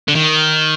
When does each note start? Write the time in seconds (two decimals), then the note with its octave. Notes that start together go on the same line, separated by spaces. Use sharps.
0.08 D3
0.16 D#3